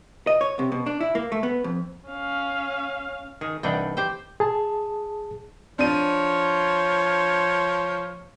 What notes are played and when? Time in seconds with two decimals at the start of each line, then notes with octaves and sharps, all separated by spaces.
0.27 D#5
0.41 C#5
0.59 C3
0.72 B2
0.86 D4
1.00 E4
1.15 A#3
1.32 A3
1.43 B3
1.64 F2
2.09 C#4 F5
3.41 D#3 G#4
3.63 C2 E3 D4 D#4 F#5 G5
3.97 G4 C5 G5
4.40 G#4 A5
5.79 F3 D4 C#5 D#7